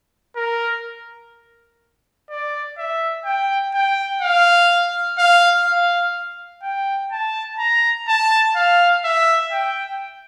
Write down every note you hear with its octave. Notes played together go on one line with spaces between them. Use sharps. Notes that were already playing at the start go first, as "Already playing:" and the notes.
A#4
D5
E5
G5
G5
F5
F5
F5
G5
A5
A#5
A5
F5
E5
G5